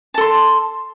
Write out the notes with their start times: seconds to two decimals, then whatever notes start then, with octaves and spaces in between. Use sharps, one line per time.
0.14 A5
0.18 A4
0.21 C6